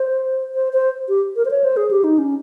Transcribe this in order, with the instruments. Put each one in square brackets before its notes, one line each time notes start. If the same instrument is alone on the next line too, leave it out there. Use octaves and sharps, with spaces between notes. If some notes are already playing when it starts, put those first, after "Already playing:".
Already playing: [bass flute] C5
C5
C5
G4
A#4
C5
C#5
C5
G#4
G4
D#4
C#4